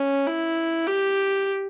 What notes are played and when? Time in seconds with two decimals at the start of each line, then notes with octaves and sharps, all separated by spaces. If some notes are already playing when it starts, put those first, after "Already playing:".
Already playing: C#4
0.27 E4
0.86 G4